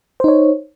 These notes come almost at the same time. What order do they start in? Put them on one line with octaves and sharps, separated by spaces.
C5 D#4 C#5